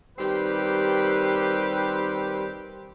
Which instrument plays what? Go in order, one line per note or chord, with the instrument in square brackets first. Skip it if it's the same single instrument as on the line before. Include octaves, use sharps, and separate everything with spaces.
[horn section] D#3 G3 C4 G4 B4